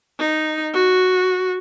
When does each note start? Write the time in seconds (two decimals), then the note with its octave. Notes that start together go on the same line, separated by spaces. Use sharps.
0.19 D#4
0.73 F#4